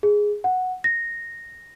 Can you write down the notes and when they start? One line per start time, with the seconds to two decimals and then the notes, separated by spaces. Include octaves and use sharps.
0.03 G#4
0.44 F#5
0.84 A#6